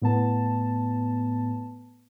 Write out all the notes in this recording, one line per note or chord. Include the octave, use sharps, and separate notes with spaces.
A2 B3 A5